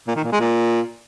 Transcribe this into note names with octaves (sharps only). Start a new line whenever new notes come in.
A#2
D#3
A#2
G#3
A#2